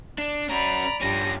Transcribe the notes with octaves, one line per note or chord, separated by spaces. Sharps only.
D4
C#4 F#4 D5 A#5 B5
G2 F3 G3 C#4 D4 A#6